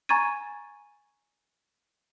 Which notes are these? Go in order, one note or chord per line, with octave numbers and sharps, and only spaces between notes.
G#5 A#5 C#6 G#6 A6 D#7